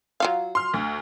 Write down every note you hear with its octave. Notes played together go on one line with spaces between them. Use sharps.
F#3 F4 F5
C6 F6
D2